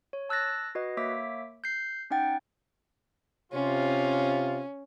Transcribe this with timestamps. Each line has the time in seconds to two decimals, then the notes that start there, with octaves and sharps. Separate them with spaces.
0.13 C#5
0.29 A5 E6 F#6 A6 A#6
0.75 F#4 B4 D#5
0.97 A#3 C#5 E5 D6 B6
1.64 G6 C7
2.10 C#4 D#4 F#5 G5 A6
3.53 C3 C#4 F4